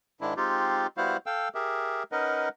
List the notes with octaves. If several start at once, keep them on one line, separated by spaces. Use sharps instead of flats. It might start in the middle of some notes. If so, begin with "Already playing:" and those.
G#2 D#3 G#3 D4 E4
G#3 C4 D#4 F4 G4
G3 B3 E4 F#4 C5 F5
A4 F5 G5 E6
G4 G#4 A#4 E5
C#4 D#4 A#4 B4 D#5 F#5